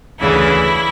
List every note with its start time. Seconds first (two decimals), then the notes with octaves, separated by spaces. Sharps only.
0.20 D2 C#3 E3 E4